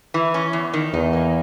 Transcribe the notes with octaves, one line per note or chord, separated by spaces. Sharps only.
E3
C#4
E2
D#3
E2 D#4
A#3